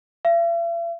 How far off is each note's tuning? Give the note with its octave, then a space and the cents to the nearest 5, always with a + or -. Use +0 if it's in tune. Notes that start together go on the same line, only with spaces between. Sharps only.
E5 +45